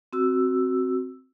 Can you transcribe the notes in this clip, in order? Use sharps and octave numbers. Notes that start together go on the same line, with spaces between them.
C4 F#4 E6